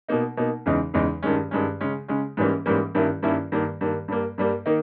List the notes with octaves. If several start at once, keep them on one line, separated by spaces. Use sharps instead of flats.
B2 A#3 D#4
B2 A#3 D#4
E2 C#3 E3 G#3 D#4
E2 C#3 E3 G#3 D#4
G2 D#3 G#3 C#4
G2 D#3 G#3 C#4
C#3 G#3 C#4
C#3 G#3 C#4
G#2 E3 G3 A#3 C#4
G#2 E3 G3 A#3 C#4
G2 D#3 A#3 C#4 E4
G2 D#3 A#3 C#4 E4
G2 D#3 A#3
G2 D#3 A#3
G2 G3 A#3
G2 G3 A#3
D#3 A#3 D#4